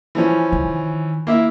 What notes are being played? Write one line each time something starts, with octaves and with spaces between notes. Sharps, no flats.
E3 F3 C#4
D#3
A#3 E4 E5